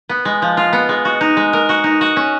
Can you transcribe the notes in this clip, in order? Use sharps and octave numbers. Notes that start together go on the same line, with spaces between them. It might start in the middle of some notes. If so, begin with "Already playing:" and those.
B3
G#3
F3
F4
B3
G#3
F#4
D#4
G#3
A#4
F#4
D#4
F#4
C#4